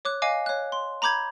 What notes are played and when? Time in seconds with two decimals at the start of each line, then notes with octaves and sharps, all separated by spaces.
0.05 C#5 D6 F#6
0.22 D#5 F5 G#5 D6
0.46 C#5 F#6
0.72 C6
1.02 A#5 B5 D6 G6 G#6